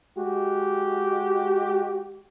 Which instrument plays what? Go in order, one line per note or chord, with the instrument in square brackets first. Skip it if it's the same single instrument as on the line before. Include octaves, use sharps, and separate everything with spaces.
[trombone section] G#3 F#4 G4